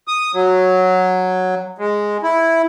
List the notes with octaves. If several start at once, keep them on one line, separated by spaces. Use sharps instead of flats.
D#6
F#3
G#3
E4